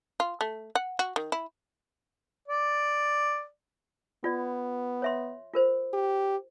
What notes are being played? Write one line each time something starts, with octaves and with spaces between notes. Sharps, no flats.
F4
A3
F#5
F#4
D#3
E4
D5
B3 F4 D5
C#5 E5 C6
F4 A#4 C5
G4